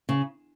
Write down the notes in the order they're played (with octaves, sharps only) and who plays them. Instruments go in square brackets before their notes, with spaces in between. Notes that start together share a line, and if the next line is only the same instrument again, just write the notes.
[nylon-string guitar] C#3